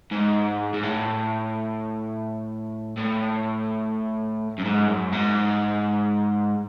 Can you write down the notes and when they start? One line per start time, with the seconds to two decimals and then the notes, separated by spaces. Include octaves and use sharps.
0.11 G#2
0.74 G#2
0.83 A2
2.97 A2
4.59 F#2
4.65 G#2
4.88 F#2
5.13 G#2